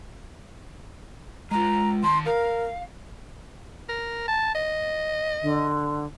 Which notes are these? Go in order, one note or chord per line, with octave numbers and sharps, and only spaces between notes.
G#3 F4 A#5
D#3 A5 C6
A#4 F5
A#4
A5
D#5
D3